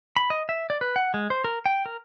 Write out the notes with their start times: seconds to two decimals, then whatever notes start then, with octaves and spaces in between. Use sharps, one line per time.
0.16 B5
0.30 D#5
0.49 E5
0.70 D5
0.81 B4
0.96 F#5
1.14 G#3
1.30 C5
1.44 A#4
1.66 G5
1.86 A#4